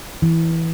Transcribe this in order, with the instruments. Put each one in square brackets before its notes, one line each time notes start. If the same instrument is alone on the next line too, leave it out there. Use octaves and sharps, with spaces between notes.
[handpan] E3